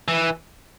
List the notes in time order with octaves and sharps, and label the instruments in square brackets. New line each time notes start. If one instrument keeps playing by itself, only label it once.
[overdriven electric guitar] E3